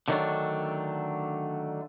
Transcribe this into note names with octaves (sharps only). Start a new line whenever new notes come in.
D3 D#3 F#3 G3 A3 D4